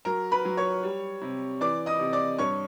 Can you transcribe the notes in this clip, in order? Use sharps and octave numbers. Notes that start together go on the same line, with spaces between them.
F#3 A#4 A#5
B4 B5
F#3
C#5 C#6
G3
C3
E3 D5 D6
D#5 D#6
C3
D5 D6
G2 C#5 C#6